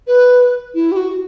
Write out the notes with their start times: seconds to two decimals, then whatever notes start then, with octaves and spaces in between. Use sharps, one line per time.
0.07 B4
0.74 E4
0.92 G4
0.96 F#4